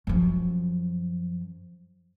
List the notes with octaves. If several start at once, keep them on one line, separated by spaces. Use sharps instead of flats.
F#2 F3